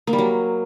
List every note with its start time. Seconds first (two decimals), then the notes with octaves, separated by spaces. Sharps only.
0.07 A#3
0.13 G3
0.18 F#3